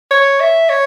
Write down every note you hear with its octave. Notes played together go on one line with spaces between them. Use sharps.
C#5
E5
C#5